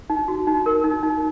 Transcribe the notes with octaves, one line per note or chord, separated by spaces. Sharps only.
D#4
F#4
D#4
A#4
D#4
D#4